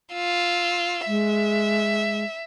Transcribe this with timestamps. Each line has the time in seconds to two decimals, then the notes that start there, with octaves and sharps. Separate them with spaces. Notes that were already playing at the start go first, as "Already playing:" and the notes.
0.14 F4 E6
1.07 G#3 E5